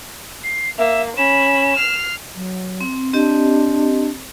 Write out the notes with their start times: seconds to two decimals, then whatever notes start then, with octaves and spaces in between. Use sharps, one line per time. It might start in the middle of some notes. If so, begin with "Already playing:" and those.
0.43 C7
0.78 A#3 E5
1.17 C#4 B5 E7
1.76 F6 C7
2.35 F#3
2.81 C4
3.14 C4 D4 G4 D#5